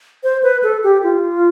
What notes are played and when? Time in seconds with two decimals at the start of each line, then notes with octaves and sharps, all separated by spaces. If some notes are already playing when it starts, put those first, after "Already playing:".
0.24 C5
0.43 B4
0.63 A4
0.84 G4
1.03 F4